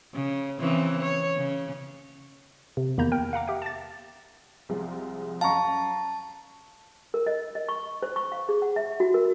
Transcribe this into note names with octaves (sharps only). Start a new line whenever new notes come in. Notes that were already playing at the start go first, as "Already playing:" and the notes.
C#3
C#3 E3 C4
C#5
C#3
C3
E2 D#3 A#3 A#5 B5 G6
A#4 G5
F5 F#5 A#5 D6
G4 E5 G5
A5 A6
C2 F3 G#3
F#2 F5 A5 A#5 C#6
A#4
D#5
D#5
C#6
C5
C#6
F5
G#4
F#5
E5
F#4
A#4